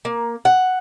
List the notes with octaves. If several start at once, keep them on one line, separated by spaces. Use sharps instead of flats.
A#3
F#5